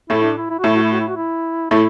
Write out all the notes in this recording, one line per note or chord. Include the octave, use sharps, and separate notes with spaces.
A2 A3 E4
D4
E4
E4
F#4
A2 A3 E4
F#4
E4
F#4
E4
F#4
E4
A2 A3 E4